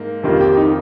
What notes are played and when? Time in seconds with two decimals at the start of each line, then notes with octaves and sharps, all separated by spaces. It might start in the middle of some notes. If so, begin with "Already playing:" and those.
Already playing: G#2 A#3
0.23 F2 D#3 A#3 F4 G4
0.40 G4
0.57 D#4